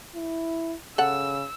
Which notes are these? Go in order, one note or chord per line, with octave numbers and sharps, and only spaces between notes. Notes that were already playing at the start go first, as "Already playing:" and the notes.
E4
C#3 A4 F#5 E6